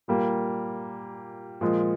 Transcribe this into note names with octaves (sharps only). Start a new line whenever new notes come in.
A#2 G3 A#3
A#2 F3 G#3